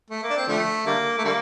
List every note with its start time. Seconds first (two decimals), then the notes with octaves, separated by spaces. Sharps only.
0.10 A3
0.23 A#3
0.30 D4
0.37 C4
0.48 D3 F3 A3
0.86 D3 G3 A#3
1.18 A3
1.24 D3 G3 A#3